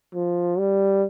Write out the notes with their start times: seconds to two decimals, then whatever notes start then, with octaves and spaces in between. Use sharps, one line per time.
0.15 F3
0.58 G3